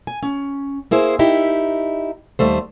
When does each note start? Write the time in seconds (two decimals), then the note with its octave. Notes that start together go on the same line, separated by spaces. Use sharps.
0.07 G#5
0.23 C#4
0.91 A#3 E4 G#4 C5
1.19 D#4 E4 G4
2.39 D#2 G3 A3 C5